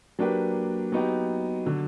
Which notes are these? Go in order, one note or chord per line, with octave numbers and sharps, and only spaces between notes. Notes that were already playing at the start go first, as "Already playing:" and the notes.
F#3 A#3 D4 G4 B4
F#3 B3 D#4 G4
D3 F#3